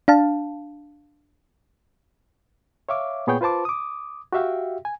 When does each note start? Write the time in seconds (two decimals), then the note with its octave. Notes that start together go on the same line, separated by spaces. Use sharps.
0.08 D4 F5 A5
2.89 C#5 E5 F5 D6
3.27 A#2 B3 G#4 C#5 G5 G6
3.41 F4 B4 C5 A5 D6
3.65 D6 D#6
4.33 F#4 G4 E5 F5 G5
4.85 G#5